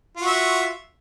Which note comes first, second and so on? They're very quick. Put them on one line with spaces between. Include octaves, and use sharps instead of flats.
F4 F#4 E5